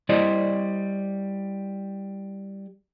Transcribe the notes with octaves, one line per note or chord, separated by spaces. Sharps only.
G3 E4 C5 D5 D#5